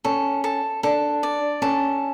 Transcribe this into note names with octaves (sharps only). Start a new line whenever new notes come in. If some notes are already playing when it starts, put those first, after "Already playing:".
C#4 A4
A4
D4 A4
D5
C#4 A4